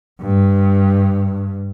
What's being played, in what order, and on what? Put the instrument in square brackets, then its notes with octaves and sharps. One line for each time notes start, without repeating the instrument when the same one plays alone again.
[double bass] G2